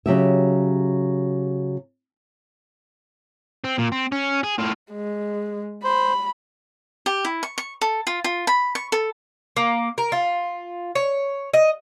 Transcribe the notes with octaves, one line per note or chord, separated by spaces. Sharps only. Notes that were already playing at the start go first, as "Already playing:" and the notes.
C#3 F#3 G4 E5
C4
A#2
C4
C#4
G#4
A2 F4
G#3
C5 B5
G4
E4
C#6
C#6
A4
F4
F4
B5
C#6
A4
A#3
A#4
F4
C#5
D#5